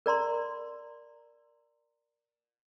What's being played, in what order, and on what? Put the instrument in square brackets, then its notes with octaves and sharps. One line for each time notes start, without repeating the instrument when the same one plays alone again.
[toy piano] A#4 D5 A#5 C6